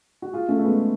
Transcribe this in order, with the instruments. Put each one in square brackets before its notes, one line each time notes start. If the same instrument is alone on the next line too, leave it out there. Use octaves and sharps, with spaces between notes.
[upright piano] F#4
F4 G#4
A3 C#4
A3
G#3 B3